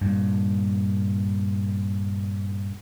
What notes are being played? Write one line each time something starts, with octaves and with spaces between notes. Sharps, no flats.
G2 A#2